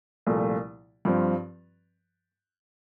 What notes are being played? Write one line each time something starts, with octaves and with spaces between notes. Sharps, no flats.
C2 A#2 F3 A3
G2 F3 C4